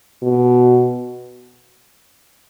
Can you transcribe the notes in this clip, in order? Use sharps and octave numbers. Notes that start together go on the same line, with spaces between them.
B2